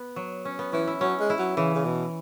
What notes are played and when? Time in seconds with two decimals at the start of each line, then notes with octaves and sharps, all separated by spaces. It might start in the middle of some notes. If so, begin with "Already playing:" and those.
Already playing: B3
0.16 F#3
0.45 C#4
0.59 B3
0.73 E3 C#4
0.87 E4
1.01 F#3 C#4
1.20 G#3
1.30 E4
1.39 F#3
1.57 C#3 E3
1.75 C#3
1.86 B2